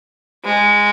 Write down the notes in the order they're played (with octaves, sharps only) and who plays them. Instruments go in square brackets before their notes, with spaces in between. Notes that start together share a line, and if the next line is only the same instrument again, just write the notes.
[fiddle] G#3